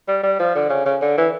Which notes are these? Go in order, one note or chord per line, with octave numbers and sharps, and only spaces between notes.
G3
G3
F3
D3
C#3
C#3
D3
E3